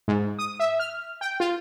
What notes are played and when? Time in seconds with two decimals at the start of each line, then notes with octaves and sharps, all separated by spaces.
0.08 G#2
0.39 D#6
0.60 E5
0.80 F6
1.21 G5
1.40 F4